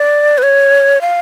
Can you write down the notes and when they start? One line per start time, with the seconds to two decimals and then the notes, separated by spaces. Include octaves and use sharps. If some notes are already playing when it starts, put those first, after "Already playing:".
Already playing: D5
0.38 B4
0.43 C#5
1.01 F5